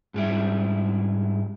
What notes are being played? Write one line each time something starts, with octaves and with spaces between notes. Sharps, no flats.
G#2 G3 E4